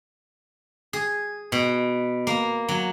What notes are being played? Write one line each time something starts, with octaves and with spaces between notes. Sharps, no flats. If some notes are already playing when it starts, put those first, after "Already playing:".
G#4
B2
A#3
F#3